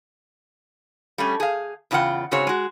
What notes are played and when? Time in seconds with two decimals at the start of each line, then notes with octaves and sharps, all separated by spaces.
1.18 G3 A3 C#4
1.40 G#4 F5
1.91 E2 C#3 F4 C5 F#5 G5
2.31 G#2 C#3 C4 F#4 G#4 C#5
2.47 G#3 F#4